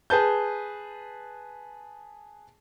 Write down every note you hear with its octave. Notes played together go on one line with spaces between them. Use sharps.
G#4 B4 A5 G6